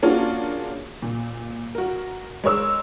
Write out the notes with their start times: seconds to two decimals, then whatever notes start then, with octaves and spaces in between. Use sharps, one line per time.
0.03 A#3 C#4 D4 F4 F#4 G#4
1.02 A#2
1.75 F#4 A#4
2.44 G#3 A#4 C#5 E6